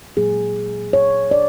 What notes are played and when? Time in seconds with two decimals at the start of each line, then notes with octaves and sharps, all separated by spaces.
0.17 A#2 F#3 A#3 G#4
0.93 C#5
1.31 D5